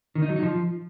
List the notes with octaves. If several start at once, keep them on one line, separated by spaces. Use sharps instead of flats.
D#3
D#4
F#3
D#4
F3